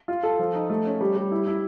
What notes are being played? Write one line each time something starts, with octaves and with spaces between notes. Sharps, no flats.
F4
A4
F3
D#4
A3
C#4
G3
G3
E4
E4